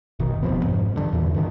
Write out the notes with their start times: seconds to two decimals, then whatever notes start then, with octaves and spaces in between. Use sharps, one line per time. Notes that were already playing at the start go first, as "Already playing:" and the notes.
0.19 F#1 B2 D#3
0.43 D#1 C3 F3 B3
0.63 F2 G#2
0.96 G2 D3
1.13 E2 A#2 E3
1.34 G2 D3 D#3